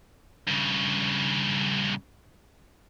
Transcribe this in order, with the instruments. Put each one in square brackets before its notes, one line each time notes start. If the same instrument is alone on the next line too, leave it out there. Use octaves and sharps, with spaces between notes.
[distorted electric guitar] G2 C#3